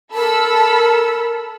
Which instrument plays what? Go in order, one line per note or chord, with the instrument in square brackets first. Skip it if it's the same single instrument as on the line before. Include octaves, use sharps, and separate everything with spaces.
[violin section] A4 B5 E6 [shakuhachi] A#4